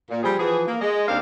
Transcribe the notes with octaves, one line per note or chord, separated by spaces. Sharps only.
A#2
F3 G3 C4 G#4
E3 F3 B3 G#4
A#3
G#3 D#5
D#2 C4 D4 G4 A#4 F5